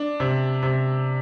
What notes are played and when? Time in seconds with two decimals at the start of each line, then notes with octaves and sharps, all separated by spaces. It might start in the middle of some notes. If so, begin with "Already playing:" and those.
Already playing: D4
0.20 C3
0.63 C3